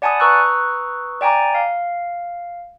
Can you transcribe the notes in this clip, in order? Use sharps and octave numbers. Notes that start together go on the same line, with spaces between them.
D5 F#5 G#5 A5 B5 D#6
B4 A#5 C#6 D#6 E6 F#6
D5 G5 G#5 A#5 D6
F5